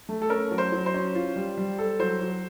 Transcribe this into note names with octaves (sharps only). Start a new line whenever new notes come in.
A3
A4
C#4 A#4
F#3
C5
F#3
C5
C#4
F4
G3
G3
A4
F#3 C5
F#3